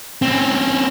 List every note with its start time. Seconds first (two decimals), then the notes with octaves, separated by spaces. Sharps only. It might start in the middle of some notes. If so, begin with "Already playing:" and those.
0.22 C4 C#4